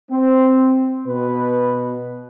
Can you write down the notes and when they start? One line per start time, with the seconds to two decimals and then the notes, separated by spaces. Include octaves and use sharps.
0.11 C4
1.06 B2 B4